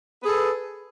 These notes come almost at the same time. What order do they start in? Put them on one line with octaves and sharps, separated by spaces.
B4 G#4 A4